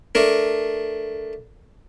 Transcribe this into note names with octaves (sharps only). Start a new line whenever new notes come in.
A3 D4 A#4